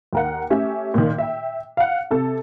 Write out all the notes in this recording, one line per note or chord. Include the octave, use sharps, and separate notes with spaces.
D#2 A#4 F#5
A3 C#4 G4 E5
A#2 D#3
E5 G5
F5 F#5
C3 A4